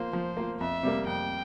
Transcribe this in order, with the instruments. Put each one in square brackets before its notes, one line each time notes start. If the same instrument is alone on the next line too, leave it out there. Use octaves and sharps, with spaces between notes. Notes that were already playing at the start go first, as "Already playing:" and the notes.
Already playing: [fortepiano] F3 A#3 F4 [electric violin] C5
[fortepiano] F3
A#3 F4
[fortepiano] F2 [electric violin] E5
[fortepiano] C3 G3 A#3
[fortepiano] F2 [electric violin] G5